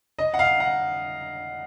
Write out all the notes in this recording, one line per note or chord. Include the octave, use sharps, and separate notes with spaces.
D#5
F#5
F5
F#5